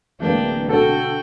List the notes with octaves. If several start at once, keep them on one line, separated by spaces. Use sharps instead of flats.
D1 E3 G#3 A#3 D4 G5
D2 B2 F#4 A4 G5